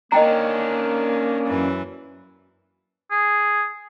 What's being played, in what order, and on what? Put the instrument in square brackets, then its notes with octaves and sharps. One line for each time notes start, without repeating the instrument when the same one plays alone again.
[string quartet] D#3 [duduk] A#3 [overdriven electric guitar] C#4 D4 [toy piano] D#5 G5 A#5
[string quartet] F#2 E3
[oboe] G#4